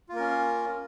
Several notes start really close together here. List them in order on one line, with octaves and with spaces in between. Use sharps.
F4 A#3 A#4 C#4